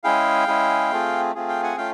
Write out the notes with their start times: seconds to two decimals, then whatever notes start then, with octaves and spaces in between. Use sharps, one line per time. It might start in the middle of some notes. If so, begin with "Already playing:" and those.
0.04 G#3 C#4 E4 G#4 F5 G5
0.47 G#3 C#4 E4 G#4
0.91 A3 C4 F4 G#4
1.35 A3 C4 F4 G#4
1.48 F5 G5
1.63 F#5 G#5
1.77 A3 C#4 F4 F5 G5